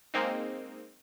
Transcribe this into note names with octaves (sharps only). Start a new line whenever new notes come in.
G#3 A#3 C4 D#4